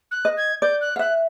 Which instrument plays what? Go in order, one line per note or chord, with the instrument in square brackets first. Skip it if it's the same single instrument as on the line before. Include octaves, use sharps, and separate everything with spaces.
[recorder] F#6
[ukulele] D#5
[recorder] G#6
[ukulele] D5 [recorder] G6
[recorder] F#6
[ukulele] F5
[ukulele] E5 [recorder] F#6